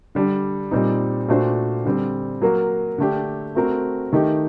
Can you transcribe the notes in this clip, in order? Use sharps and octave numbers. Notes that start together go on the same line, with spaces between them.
D3 G3 D4
A#2 G3 C4 D#4
A#2 A3 D4 F#4 C5
D3 G3 C4
F#3 A#3 F#4 A#4
D3 A3 D4 G4
A3 C4 F#4 A#4
D#3 A3 D#4 G4